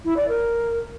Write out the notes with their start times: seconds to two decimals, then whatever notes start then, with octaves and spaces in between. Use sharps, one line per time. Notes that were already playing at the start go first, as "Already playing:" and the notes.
0.05 E4
0.17 D5
0.28 A#4